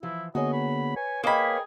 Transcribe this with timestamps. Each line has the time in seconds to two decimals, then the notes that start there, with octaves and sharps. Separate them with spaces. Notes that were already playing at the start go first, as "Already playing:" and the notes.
0.03 E3 F3 E4
0.35 D3 A#3 B3 F#4 G#4 C#5 D#5
0.52 B5
0.96 B4 C#5 G#5
1.24 A#3 G#4 A#4 D#5 G5 B5